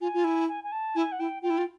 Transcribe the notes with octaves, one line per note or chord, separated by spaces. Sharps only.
F4 G#5
F4
E4
G#5
G#5
A5
E4 G#5
F#5
E4 G5
F4 G5
E4
F4